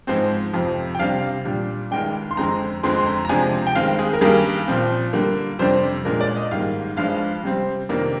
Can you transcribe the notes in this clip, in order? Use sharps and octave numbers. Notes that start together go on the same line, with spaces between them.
G#2 F3 G#3 C4 C5
F2 C3 F3
G5
C3 G3 D4 F5
A#2 G3 D4
G2 D#3 G#3 D4 G5
C6
F2 D3 G#3 C4 A#5
F2 D3 G#3 C4 C6
C6
A#5
A#5
C3 F3 G#3 D4 G#5
G5
G2 D#3 G#3 C4 F5
G#4
A#4
G2 D#3 G3 A#3 G#4
A#2 F3 C4
D3 G3 A#3
F2 C3 G3 D4 C5
A#2 G#3 D4 A#4
D5
D#5
G#2 D#3 G3 A#3 F5
G2 F3 G#3 D4 F5
C3 G3 C4
F2 C3 D#3 A#3 D4